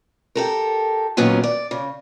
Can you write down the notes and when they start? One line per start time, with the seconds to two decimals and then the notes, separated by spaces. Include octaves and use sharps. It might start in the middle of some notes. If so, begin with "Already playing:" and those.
0.35 G4 A4 A#4
1.17 D#2 A#2 D#3 F#3 B3 C#4
1.43 D5
1.71 C#3